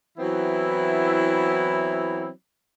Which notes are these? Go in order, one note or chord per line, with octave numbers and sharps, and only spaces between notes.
E3 F#3 B3 C4 E4